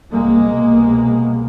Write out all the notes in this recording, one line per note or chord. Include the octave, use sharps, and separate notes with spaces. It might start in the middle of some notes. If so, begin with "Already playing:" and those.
C2 B2 G#3 A#3
C2 B2